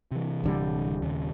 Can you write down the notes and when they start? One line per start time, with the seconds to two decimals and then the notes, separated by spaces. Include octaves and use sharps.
0.12 C3 E3
0.44 D1 D3 G3
1.02 D#1 D#2 C#3